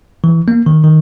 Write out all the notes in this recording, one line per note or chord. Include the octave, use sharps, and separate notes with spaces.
E3
A#3
D#3
D#3